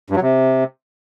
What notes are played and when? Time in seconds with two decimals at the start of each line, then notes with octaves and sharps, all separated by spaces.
0.10 G2
0.16 F#3
0.22 C3